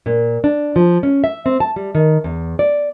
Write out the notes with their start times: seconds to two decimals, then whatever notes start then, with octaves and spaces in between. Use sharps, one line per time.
0.06 A#2
0.44 D4
0.76 F3
1.03 C#4
1.24 E5
1.46 C4
1.60 A5
1.76 G3
1.95 D#3
2.24 E2
2.59 D5